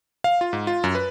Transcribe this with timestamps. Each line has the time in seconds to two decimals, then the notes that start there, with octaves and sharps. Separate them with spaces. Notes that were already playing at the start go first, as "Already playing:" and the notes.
0.24 F5
0.41 F4
0.53 G#2
0.67 F4
0.84 F#2
0.95 B4